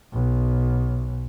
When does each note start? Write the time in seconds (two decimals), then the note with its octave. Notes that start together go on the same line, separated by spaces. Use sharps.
0.13 B1